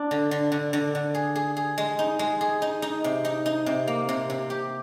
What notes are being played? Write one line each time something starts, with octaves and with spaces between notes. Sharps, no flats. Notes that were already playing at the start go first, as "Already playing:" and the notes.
Already playing: D4
D3
D3
D3
D3
D3
G#4
G#4
G#4
G#3
D#4
G#3
G#4
D#4
D#4
C3
D#4
D#4
C3
A#3
C3
C3
G4